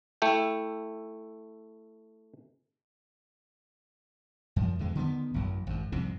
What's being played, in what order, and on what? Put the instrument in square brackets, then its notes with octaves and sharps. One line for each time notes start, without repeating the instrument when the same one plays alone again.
[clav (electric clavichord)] A3 E4 G5
[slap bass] F#2 F3
E2 D3 G#3
D3 D#3 A3 B3
A1 F#2 F#3
G#1 F#2
C2 F2 G#2 C3